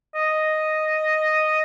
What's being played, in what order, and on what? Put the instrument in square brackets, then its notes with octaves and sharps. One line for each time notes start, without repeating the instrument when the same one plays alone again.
[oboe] D#5